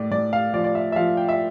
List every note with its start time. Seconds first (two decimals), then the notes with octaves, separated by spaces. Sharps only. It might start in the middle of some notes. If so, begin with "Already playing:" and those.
Already playing: A2 D5
0.11 A2 D5
0.33 F5
0.53 F3 D5
0.64 D5
0.75 E5
0.92 E5
0.96 F3 F5
1.17 G5
1.29 E5